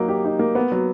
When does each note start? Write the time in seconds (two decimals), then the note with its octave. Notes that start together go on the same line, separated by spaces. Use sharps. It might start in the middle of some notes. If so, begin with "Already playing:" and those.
Already playing: F#3 A#3 D#4
0.09 G4
0.25 D#4
0.39 A#3
0.55 B3
0.72 F#3